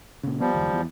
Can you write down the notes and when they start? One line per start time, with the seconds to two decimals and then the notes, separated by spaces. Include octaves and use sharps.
0.23 A#2 C#3
0.40 F3 G3 B3
0.55 F#1 D#2
0.73 E2